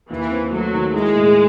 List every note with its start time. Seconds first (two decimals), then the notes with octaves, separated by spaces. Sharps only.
0.10 D#2 E3
0.31 C4
0.52 F#3 A3
0.73 D#3
0.94 G#3 E4
1.15 A2